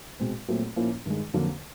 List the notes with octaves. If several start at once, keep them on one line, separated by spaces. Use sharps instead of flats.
B2 G#3 C4
A#2 F#3 A3 C4
A#2 F3 A#3 C#4 E4
G2 D#3 G#3
F2 D3 F#3 A#3